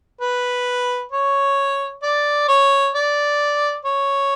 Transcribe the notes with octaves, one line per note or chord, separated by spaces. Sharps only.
B4
C#5
D5
C#5
D5
C#5